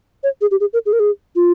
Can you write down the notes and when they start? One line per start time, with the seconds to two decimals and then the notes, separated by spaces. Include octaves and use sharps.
0.23 C#5
0.41 G#4
0.51 G4
0.60 G#4
0.73 A#4
0.86 G#4
0.93 A#4
1.00 G#4
1.36 F4